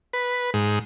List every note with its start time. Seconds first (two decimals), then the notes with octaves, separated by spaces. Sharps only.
0.13 B4
0.54 G#2